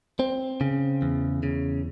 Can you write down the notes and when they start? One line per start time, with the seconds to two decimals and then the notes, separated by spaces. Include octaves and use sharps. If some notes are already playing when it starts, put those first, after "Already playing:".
0.20 C4
0.61 C#3
1.02 E2
1.43 C#3